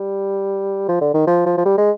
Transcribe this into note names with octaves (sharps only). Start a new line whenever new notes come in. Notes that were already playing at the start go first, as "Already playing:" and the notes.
Already playing: G3
F3
D3
D#3
F3
F3
F3
G3
G#3